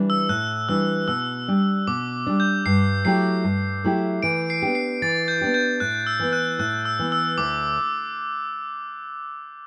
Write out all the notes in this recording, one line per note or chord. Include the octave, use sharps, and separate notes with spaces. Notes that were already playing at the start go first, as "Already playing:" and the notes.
Already playing: E3 G3 D4
E6
A2 F#6
E3 G3 D4 E6
B2 E6
G3 D4
B2 D6
G3 D4
G6
G2 C7
F#3 A3 E4 G4 C7
G2
F#3 A3 E4 G4
E3 D7
C7
B3 D4 G4
C7
E3 A6
G6
B3 D4 G4
G6
A2 F#6
E6
E3 B3
F#6
A2 F#6
E6
E3 B3
E6
D2 D6